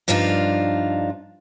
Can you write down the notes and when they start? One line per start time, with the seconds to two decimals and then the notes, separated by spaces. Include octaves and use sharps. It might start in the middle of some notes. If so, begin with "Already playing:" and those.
0.08 G2 F3 D4 D#4 F4